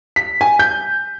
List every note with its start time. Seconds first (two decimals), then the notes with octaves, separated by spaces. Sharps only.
0.16 B6
0.41 G#5
0.59 G6